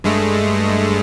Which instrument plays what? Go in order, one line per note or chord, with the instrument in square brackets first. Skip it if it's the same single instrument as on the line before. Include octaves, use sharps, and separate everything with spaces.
[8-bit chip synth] G2 G#3 A3